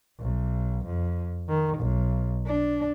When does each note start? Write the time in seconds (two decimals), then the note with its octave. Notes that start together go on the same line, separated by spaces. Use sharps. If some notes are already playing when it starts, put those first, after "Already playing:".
0.19 B1
0.86 F2
1.49 D#3
1.78 B1
2.46 D4